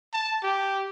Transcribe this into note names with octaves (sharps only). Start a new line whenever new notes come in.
A5
G4